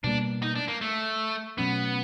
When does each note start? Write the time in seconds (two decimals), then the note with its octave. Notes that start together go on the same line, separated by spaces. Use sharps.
0.04 B2 G3 A#3 D4
0.42 D#4
0.56 D4
0.68 A#3
0.81 A3
1.58 B2 F#3 A3 B3 C#4